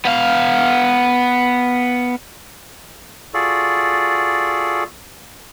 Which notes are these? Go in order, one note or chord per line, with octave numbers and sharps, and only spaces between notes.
B3 F5
F4 F#4 G#4 A4 D5